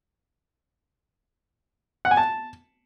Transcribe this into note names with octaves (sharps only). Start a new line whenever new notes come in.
F#5
G#5
A5